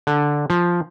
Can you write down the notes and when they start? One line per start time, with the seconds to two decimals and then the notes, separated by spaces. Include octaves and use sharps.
0.07 D3
0.50 F3